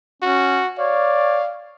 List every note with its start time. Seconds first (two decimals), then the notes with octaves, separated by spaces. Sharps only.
0.23 C#4 F#4
0.78 C#5 D5 F5